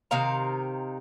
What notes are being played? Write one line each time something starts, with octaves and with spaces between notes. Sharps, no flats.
C3 D#3 F5 A#5